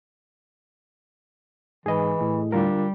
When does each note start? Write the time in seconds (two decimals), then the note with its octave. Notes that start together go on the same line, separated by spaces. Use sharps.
1.86 G#2 E3 G#4 D#5
2.21 A2
2.52 D3 G3 D4 F4 A#4